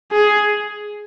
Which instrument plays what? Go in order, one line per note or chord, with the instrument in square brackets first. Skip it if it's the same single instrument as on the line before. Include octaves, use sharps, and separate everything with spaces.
[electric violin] G#4